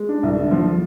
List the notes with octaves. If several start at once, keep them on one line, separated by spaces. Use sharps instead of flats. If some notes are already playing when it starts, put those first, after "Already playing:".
Already playing: G#3
D4
C2
D3
F3